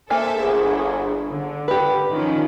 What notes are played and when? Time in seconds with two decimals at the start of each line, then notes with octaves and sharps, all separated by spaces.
0.10 A#3 A4 C5 E5 G#5
0.40 G1 G#4
1.29 D3
1.68 G4 B4
2.11 D#3 F3 C#4